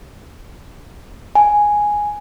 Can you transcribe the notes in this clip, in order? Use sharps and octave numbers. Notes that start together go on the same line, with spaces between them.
G#5